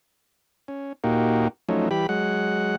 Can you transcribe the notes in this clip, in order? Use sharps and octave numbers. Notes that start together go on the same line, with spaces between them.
C#4
A#2 A#3 D#4 F#4 G4
F3 F#3 A3 C#4 D#4
E3 G3 G4 B5
F#3 G#3 F#5